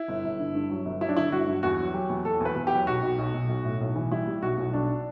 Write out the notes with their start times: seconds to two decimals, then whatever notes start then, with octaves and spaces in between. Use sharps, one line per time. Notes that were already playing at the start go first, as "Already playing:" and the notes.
Already playing: E4
0.08 G1
0.24 G1
0.39 D3
0.55 G2
0.70 F#3
0.85 G1
1.01 F#3 E4
1.09 D4
1.16 D3 E4
1.32 G1 F#4
1.47 G2
1.63 E2 F#4
1.78 F#3
1.94 F#3 G4
2.10 E2
2.25 E2 A4
2.40 E2 B4
2.56 E2
2.67 G4
2.72 F#3
2.87 B1 F#4
3.03 B1
3.19 B1
3.34 B1
3.49 B1
3.65 A2
3.81 B1
3.96 E3
4.11 G3 E4
4.27 G3
4.42 B1 F#4
4.57 B1
4.74 B1 D4